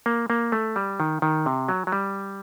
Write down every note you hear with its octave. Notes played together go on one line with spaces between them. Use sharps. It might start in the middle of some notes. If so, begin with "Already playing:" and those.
A#3
A#3
A3
G3
D#3
D#3
C3
F#3
F#3
G3